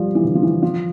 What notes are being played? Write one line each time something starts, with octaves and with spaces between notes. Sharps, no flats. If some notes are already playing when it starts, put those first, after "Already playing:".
Already playing: F3 G3
E3
D3
F3
E3
F3